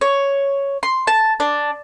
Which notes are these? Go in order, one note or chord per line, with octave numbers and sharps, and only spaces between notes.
C#5
C6
A5
D4